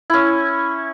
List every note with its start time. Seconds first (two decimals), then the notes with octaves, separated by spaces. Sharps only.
0.10 C#4 E4